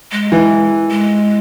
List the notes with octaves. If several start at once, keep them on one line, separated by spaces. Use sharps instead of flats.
G#3
E3
G#3